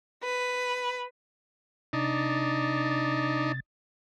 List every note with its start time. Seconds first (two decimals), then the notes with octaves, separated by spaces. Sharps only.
0.23 B4
1.93 C3 D4 D#4 A6